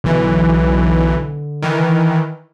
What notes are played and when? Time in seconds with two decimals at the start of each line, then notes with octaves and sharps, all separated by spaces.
0.04 B1 D3 E3
1.62 D#3 E3